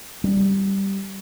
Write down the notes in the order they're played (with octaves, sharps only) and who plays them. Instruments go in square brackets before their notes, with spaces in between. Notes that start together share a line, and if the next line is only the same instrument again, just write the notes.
[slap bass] G3